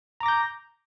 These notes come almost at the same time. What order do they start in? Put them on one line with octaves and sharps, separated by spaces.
A#5 D6 A#6 G6